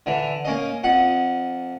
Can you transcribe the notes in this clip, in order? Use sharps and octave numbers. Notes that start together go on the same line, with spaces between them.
D3 E3
A#3 C#4 D#5
F2 F#5 D#6